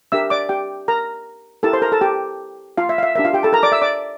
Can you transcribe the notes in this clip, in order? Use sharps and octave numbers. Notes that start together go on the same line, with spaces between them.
D4 G4 A#4 E5 E6
D5 D6
G4 G5
A#4 A#5
E4 G4 A4 A#4 A5
C5 C6
A#4 A#5
A4 A5
G4 G5
F4 F5
E5
F5
E5
D4 G4 A#4 E5
F4 F5
G4 G5
A4 A5
A#4 A#5
D5 D6
E5 E6
D5 D6